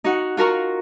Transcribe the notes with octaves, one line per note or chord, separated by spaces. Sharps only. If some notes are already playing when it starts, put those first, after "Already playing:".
D#4 F#4 F#5
F4 F#4 A#4 A#5 C#6